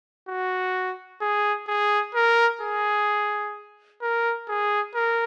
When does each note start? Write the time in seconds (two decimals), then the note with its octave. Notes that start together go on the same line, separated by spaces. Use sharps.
0.28 F#4
1.21 G#4
1.67 G#4
2.15 A#4
2.61 G#4
4.02 A#4
4.48 G#4
4.94 A#4